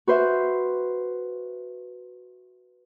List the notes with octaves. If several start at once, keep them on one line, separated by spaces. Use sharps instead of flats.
F#4 B4 C5 E5